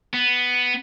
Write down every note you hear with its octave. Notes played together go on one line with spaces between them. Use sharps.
B3